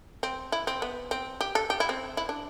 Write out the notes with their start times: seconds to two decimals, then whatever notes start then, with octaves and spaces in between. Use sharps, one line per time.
0.23 C4
0.52 E4
0.67 C4
0.82 B3
1.11 C4
1.41 G4
1.55 A4
1.70 G4
1.80 E4
1.89 C4
2.17 E4
2.29 D4